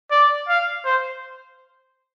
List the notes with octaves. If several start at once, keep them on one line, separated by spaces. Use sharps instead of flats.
D5
F5
C5